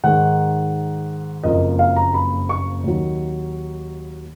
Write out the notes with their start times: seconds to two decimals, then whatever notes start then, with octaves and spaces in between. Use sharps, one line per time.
0.04 G#2 D#3 G#3 F#5
1.44 F#1 F2 F3 A#3 D#5
1.79 F5
1.96 A#5
2.14 B5
2.49 C#6
2.84 D#2 D#3 F#3